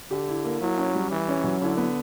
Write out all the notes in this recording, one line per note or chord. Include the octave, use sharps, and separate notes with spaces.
D3 G4
E4
A#3
F#3 E4
C#4
G3
E3 G4
C#4
F#3
D3 E4
B3